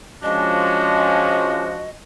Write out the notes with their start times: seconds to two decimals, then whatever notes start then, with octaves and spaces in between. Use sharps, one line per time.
0.23 F3 G#3 C#4 D4 F#4 D#5